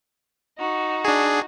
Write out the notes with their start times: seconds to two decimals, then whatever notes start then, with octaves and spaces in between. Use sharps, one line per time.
0.58 D#4 F#4
1.05 D4 G#4